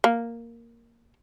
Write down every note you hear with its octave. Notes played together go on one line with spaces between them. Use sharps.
A#3